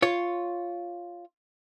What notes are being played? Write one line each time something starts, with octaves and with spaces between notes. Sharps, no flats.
F4 C#5